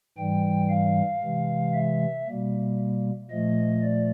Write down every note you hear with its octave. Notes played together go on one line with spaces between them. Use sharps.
G#2 E3 G3 G5
F5
C3 E3 G#3
E5
B2 G3 A#3
A#2 F3 A3 D#5
D5